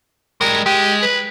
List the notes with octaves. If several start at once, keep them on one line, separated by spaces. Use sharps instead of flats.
G3 G#3 A#4
G#3 G4
B4